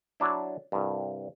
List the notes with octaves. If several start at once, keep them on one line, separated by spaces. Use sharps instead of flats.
F#3 D4 E4
C2 G2